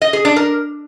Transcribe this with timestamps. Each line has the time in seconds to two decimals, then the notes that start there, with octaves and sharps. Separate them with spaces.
0.02 D#5
0.13 G#4
0.25 D4
0.36 A#4